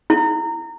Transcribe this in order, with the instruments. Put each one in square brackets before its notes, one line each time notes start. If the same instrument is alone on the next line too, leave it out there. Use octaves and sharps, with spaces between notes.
[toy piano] E4